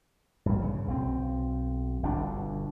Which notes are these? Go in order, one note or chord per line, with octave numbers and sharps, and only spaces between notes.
A#1 G2
C#3
B1 C4
G1 B2 D4